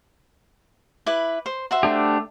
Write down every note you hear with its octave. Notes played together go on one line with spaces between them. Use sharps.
E4 B4 D6
C5
F#4 C5 E5
A3 D4 G4